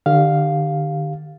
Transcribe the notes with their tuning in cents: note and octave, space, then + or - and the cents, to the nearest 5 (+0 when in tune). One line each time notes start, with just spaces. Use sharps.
D3 +45 G4 +0 F5 +0